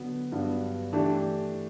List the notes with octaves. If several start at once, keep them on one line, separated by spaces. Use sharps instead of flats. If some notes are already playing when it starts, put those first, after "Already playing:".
Already playing: D3 F#3 B3
G2 F#3 B3 D4
E3 A3 D4 G4